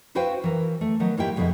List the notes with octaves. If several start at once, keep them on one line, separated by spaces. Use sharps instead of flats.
E4 F#4 B4 C5 F5 G5
E3 A#4
A3
D#3 F#3 B3
G#2 A#3 E4 G4 G5
F2 B2 D3 G#3 E4